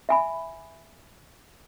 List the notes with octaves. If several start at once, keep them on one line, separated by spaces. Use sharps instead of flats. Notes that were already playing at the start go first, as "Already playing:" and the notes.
E5 G#5 B5